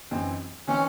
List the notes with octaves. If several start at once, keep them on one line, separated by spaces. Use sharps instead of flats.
F#2 E3 C4 D#4
E3 C4 C#4 D#4